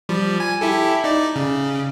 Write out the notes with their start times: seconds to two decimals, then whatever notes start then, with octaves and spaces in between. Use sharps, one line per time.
0.09 F3 G3
0.40 G#5
0.61 E4 G4 A4
1.04 D#4 D5
1.36 C#3